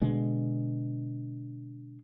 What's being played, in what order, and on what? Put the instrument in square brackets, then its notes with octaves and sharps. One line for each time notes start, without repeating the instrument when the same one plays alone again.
[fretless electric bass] B2 D3 G#3